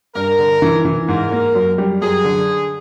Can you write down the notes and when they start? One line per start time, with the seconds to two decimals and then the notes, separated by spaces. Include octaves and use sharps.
0.15 G2 A#4
0.39 D3
0.62 E3
0.85 E3
1.08 G#2 A#4
1.32 A#3
1.55 F#2
1.78 G3
2.02 F#2 G#4
2.24 D3